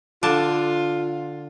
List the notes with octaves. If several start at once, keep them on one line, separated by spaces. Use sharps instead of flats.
D3 F4 A5